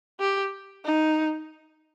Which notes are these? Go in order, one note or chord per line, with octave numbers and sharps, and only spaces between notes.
G4
D#4